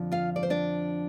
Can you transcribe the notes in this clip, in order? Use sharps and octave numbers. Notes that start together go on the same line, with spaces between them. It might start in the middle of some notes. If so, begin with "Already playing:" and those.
Already playing: F2 D3 F3
F4 F5
D5
C5
D4 D5